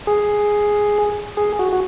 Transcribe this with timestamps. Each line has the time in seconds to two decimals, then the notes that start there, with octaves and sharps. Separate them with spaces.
0.07 G#4
1.37 G#4
1.59 F#4
1.73 F#4